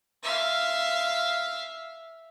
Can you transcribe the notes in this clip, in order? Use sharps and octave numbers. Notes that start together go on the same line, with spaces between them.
E5 F5